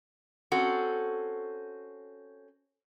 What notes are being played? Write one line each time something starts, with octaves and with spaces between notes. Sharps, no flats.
C4 C#4 F#4 A4